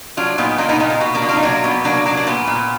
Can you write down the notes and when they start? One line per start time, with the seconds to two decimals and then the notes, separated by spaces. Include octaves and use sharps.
0.17 F#3 D4 F4
0.38 A#2 B3 D#4
0.58 A#2 A#3 D4
0.69 B3 D#4
0.80 A#2 B3 D#4
0.90 A#3
1.00 B2 B3
1.15 A#3 D4
1.22 B2
1.29 D4 F4
1.37 D#4
1.43 F#3 A#3 D4
1.64 B2 B3
1.84 F#3 A#3 D4
2.06 F#3 A#3 D4
2.17 D4
2.27 A#2 B3
2.47 A#2